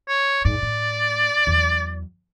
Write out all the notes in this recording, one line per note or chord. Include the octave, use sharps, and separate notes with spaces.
C#5
G#2 D5
A2
E2 F#3